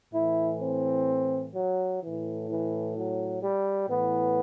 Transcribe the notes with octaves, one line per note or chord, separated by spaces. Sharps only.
A2 E3 E4
C4
F#3
A2 E3
E3
F#3
G3
A2 E3 B3